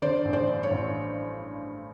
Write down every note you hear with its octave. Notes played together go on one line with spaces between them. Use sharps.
D3 C5 D5
A1
C5 D5
G2
C#5
A1